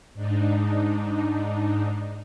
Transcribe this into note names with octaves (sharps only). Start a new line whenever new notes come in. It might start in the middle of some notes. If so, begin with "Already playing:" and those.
G#2 D4 D#4